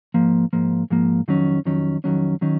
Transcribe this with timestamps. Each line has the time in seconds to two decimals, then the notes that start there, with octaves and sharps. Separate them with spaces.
0.14 G#2 F3 A#3
0.53 G#2 F3 A#3
0.90 G#2 F3 A#3
1.28 F2 D#3 F#3 C#4
1.65 F2 D#3 F#3 C#4
2.04 F2 D#3 F#3 C#4
2.41 D#3 F#3 C#4